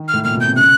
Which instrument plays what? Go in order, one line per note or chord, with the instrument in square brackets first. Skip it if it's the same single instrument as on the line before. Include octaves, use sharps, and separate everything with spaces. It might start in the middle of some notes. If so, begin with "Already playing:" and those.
Already playing: [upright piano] D#3
[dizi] F6
[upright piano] A2
[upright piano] A#2 [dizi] F6
[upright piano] B2
[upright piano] C3 [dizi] G6
[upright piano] C#3 [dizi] F#6